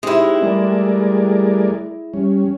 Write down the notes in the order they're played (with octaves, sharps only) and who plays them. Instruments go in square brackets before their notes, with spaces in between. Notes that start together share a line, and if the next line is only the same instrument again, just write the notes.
[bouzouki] G#3 E4 [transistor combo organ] C4 D#4 G4
[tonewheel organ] G3 A3 [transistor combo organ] G#4 A#4 D5
[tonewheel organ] G3 [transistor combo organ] C#4